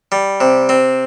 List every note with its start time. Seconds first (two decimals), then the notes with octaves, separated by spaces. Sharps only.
0.12 G3
0.41 C3
0.69 C4